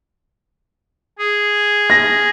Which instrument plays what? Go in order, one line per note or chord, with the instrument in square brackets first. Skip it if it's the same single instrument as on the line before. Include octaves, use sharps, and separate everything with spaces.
[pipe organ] G#4
[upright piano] A#6